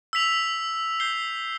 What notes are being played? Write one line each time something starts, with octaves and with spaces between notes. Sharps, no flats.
E6 B6 F7
G6 C7 G7